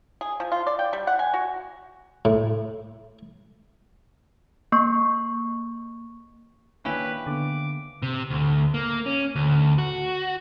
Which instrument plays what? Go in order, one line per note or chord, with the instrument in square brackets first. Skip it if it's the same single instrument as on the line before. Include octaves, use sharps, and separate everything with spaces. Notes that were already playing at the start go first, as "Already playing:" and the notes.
[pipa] G#4
F3
F4
D5
G5
G3
F#5
G#5
F#4
[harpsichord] A2
[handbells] A#3 C#6
[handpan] D#3 A#3 D4 [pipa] C#4 E4 G4 [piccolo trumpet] B4
[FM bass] D3 [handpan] B3 [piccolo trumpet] D6
[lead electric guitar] C3
D2
A#3
C#4
D2
F#4